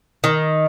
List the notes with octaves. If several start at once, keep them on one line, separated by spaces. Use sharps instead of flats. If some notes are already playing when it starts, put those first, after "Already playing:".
D#3